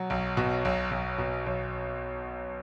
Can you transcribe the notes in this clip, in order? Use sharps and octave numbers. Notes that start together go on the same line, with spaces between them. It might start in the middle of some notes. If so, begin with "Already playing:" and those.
Already playing: B2 F#3
B1
B2
B1
B1
B2
B1